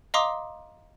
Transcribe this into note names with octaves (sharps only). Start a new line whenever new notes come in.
D#5 F5 A#5 C6 D6 D#6